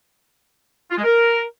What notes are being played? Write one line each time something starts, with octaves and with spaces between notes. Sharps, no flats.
F4
G#3
A#4